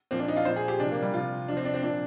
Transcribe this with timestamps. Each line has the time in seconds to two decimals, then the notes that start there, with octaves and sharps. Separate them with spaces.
0.11 A#2 F3 C4
0.19 D4
0.28 D#4
0.37 F4
0.45 F3 C5
0.50 A#2
0.56 G#4
0.68 G4
0.79 C3 D4
0.84 F3
0.91 A#3
1.03 G3
1.13 C3 F3 F4
1.48 C3 F3 D4
1.57 C4
1.65 D4
1.74 C4
1.82 A#2 F3 D4